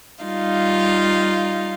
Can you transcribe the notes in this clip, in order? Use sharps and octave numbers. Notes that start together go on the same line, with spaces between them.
G3 D#4 F4 F5